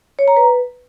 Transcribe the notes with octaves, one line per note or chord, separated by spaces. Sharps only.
C#5
A#5
B4